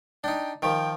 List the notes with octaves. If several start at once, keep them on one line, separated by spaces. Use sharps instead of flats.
D4 D#4 G5
D#3 F3 G5